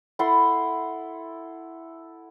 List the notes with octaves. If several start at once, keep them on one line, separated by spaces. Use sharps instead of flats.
E4 A4 F#5 C6